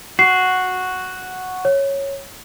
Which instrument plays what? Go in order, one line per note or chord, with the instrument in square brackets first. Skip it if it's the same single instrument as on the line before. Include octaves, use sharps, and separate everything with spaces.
[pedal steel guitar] F#4 [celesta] C7
[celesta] C#5